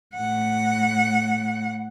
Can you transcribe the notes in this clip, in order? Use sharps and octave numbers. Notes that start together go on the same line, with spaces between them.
A2 F#5